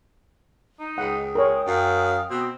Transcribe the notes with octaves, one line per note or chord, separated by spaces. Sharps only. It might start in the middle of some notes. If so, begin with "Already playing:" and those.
D#4
C#2 F#5 G5 D#6
G#3 A#4 C#5
F#2 F5
B2 C4